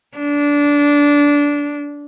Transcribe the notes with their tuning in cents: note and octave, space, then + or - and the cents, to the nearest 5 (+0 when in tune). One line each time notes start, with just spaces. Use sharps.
D4 -20